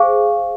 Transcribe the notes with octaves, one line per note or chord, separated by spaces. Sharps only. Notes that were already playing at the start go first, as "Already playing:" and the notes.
Already playing: G#4 C5 F5 G#5 C#6